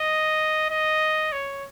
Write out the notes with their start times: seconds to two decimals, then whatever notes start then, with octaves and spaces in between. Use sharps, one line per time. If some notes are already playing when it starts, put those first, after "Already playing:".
Already playing: D#5
0.70 D#5
1.32 C#5